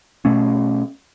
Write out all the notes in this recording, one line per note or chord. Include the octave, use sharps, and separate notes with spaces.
B2 A3 C#4